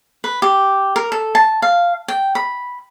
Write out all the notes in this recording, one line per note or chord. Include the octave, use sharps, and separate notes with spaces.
B4
G4
A#4
A4
A5
F5
G5
B5